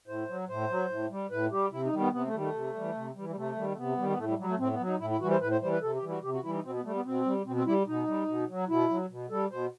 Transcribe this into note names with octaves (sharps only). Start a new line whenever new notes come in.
A2 C5
F#3
A2 C5
F#3
A2
G3
A2 B4
G3 G4
C3 E4
D#4
D#3 G3
B3
C3 B3
A3
D#3 G3
A3
C3
E3 G3
C3
E3 G3
G3
C3 A3
D#3 G3
A3
C3 B3
D#3 G3
B3
A2 A3
G3
F#3 G3
A3
A2 C4
B3
F#3
D#4
A2 E4
E4
E3 G3 F#4
C5
A2 B4
C5
E3 G3 C5
B4
C3 A4
G4
E3 G3
F#4
C3 G4
F#4
E3 G3 E4
D#4
B2 C4
B3
G3 A3
B3
B2 C4
G3
B2 C4
C4
G3 E4
B2 D#4
G3
B2
F#3
B2 E4
F#3
B2
G3 A4
B2 C5